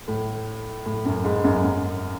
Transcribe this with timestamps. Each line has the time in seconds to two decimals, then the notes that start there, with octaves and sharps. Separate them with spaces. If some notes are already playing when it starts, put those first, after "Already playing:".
0.08 A2
0.86 A2
1.05 F#2
1.25 G#2
1.44 F#2
1.64 F#2